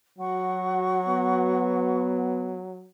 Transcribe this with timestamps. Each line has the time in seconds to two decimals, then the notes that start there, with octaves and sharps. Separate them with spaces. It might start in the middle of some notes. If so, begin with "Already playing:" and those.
0.19 F#3 F#4 F#5 C#6
1.06 B3